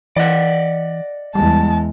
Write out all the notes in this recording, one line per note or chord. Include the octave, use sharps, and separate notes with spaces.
E3 D5 D#5 F#5
E2 G3 G#3 A5